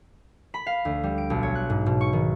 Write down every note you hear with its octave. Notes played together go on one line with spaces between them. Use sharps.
B5
F5
D2
G3
D7
B1
C#5
F#6
G#2
B2
C#6
D#3